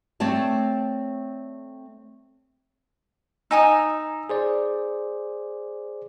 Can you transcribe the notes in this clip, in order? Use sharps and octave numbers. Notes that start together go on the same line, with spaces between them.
A3 C4 C#5 D5 A5
D#4 G#5 A#5 D#6 E6
G#4 C5 D5